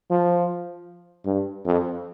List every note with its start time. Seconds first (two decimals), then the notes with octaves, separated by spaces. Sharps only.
0.10 F3
1.26 G2
1.65 F2